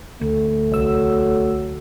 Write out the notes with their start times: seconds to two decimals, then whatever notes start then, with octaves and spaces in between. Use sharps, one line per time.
0.21 D2 A3
0.72 C2 F#3 E6